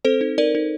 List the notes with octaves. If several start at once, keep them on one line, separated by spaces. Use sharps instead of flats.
C4 A4 C5
D#4
D#4 A#4 D5
D#4